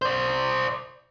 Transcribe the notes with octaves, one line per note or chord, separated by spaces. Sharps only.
C5 D5